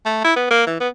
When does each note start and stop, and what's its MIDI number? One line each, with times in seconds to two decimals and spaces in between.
0.06 0.21 57
0.24 0.33 64
0.36 0.49 59
0.51 0.65 58
0.66 0.76 52
0.80 0.88 59